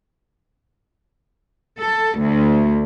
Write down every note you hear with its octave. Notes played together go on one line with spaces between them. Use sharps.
A4
D2